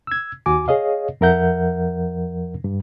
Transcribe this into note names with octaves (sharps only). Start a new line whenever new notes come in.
E6 G#6
D#2 F#4 G#5 D6
G#4 C#5 D#5 F5
F2 F3 A#4 E5 F#5 G6
G2